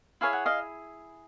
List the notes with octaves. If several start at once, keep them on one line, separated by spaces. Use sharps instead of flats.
E4 G#4 C#5 F5
F#5
D#5 F5